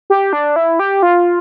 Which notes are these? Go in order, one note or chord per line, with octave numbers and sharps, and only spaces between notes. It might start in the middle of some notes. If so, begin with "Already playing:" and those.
G4
D4
E4
G4
F4